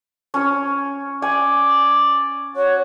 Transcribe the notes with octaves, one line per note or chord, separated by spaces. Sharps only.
C#4 C#5
D5 G#5
F#4 C#5